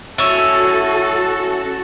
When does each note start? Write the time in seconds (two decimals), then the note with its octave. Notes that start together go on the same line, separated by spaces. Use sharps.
0.18 C#4 E4 F#4 A4